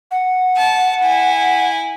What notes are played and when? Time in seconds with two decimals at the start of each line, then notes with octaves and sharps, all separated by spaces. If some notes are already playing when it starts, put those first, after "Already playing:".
0.11 F#5
0.57 A5
1.02 E4 G#5